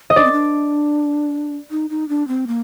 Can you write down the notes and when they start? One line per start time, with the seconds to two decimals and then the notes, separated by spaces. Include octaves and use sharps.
0.10 D#5
0.16 D4 D5
0.24 C4
0.32 D4
1.71 D#4
1.90 D#4
2.09 D4
2.28 C4
2.47 A#3